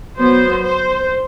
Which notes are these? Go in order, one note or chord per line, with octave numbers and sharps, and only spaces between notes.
F#3 B3 C5
C5